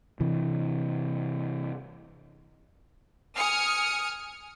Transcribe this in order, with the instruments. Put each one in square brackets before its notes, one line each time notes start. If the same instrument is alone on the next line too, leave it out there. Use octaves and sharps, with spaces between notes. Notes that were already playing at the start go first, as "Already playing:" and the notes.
[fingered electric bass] C3 E3
[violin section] G#5 D#6 F6 C#7